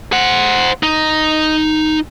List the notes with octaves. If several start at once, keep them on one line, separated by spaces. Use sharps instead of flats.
C5 F#5
D#4